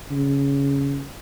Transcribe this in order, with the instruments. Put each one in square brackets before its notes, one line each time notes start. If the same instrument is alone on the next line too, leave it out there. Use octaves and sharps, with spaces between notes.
[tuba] C#3